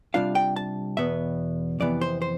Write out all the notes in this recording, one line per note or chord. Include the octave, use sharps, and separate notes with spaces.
C3 G3 D4 F4 F5
G5
A5
E2 B2 B3 E5
F2 C3 E3 B3 D5
C5
C5